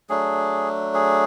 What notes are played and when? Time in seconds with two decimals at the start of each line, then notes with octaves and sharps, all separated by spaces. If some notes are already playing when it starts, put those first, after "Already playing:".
0.09 F#3 A3 D4 G#4
0.94 G#4